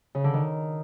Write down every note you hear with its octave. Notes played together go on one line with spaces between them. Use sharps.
C#3
D3
D#3